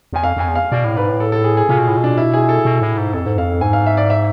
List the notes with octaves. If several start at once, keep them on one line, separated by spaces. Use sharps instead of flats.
E2 G#5
F2 F5
F2 G#5
E2
F5
B2 D5
A2
G#2 B4
A2
A4
A4
G#4
G#4
C3 F4
B2
A2
B2
D4
E4
G#4
A4
B2
A2
G#2
F2 A4
G#2
F2 F5
G#2 G#5
F5
E5
D5
E5